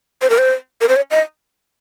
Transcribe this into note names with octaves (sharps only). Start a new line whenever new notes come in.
C5
A#4
C5
A#4
C5
C#5
D#5